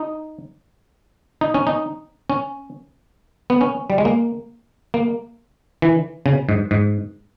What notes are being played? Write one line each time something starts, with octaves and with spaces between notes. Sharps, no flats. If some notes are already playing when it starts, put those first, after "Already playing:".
Already playing: D#4
D#4
C#4
D#4
C#4
B3
C#4
G3
G#3
A#3
A#3
E3
C#3
G#2
G#2